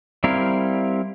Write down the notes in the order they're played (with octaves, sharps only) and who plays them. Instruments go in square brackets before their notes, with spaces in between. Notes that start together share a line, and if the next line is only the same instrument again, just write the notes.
[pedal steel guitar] G3 C4 E4 A#4 F5